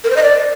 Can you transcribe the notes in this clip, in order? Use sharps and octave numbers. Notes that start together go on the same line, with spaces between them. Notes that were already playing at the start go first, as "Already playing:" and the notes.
A#4
C5
D#5
D5